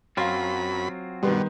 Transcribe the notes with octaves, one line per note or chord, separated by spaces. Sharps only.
F#2 F#3 C4 F4 F5 B5 C6
G2 B2 D#3 G3 B3 C6